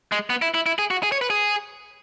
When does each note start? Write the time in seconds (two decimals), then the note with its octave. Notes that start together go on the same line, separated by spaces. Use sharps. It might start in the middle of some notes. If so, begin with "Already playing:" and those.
0.12 G#3
0.30 B3
0.42 E4
0.54 E4
0.66 E4
0.79 G#4
0.91 F#4
1.03 G#4
1.12 C#5
1.21 B4
1.30 G#4